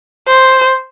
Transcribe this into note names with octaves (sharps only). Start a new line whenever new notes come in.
C5